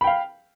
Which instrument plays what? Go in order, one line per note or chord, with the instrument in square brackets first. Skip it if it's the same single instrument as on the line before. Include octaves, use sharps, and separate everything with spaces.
[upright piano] B5
G5
F5